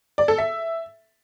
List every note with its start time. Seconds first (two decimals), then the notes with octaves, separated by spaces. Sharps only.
0.18 D5
0.28 A4
0.38 E5